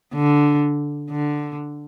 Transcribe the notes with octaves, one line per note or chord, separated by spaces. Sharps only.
D3
D3